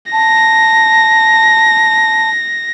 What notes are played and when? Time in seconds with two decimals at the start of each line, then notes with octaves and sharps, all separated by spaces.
0.12 A5 A#6